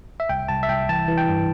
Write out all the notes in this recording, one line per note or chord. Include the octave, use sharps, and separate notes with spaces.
E5
C2 G5
C2 A5
E5
C2 G5
E3 A5
E3
G5
G2